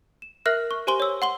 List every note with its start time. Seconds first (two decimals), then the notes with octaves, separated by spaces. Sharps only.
0.22 E7
0.45 A#4 E5 F6 F#6 A#6 C7
0.71 C#6
0.87 G4 C5 G#5 C6 G7
1.00 C#5 E6
1.22 F#5 C6 G7